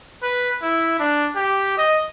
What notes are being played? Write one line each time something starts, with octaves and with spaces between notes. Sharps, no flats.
B4
E4
D4
G4
D#5